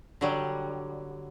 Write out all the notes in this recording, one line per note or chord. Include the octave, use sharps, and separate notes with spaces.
D3 F#3 G3